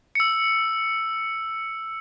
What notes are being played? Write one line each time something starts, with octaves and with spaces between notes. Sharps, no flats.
E6 C#7